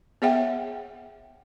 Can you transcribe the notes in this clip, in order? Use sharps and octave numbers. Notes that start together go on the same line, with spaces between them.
B3 G#4 C#5 E5 F#5 G5